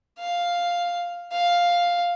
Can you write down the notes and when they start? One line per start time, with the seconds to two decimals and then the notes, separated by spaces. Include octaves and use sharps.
0.19 F5
1.32 F5